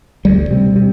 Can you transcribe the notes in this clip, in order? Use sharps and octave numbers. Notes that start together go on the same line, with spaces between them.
D2 G3
C3
C3